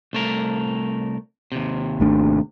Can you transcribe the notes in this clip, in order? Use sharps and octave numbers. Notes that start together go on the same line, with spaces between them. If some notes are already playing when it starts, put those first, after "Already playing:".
C2 A3 A#4
D#2 C3
G#1 A3 D4